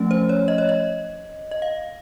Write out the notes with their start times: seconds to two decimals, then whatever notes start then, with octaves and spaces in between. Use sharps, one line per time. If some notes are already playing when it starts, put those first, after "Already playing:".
Already playing: F3 A3 C#4
0.11 C5
0.29 C#5
0.48 D#5
0.58 C#5
0.69 D#5
1.51 D#5
1.62 F5